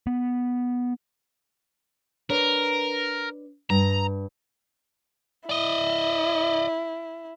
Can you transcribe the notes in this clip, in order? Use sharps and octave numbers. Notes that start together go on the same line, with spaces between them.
B3
D4 A#4 B4 C#5
G2 A#5
E4 D5 D#5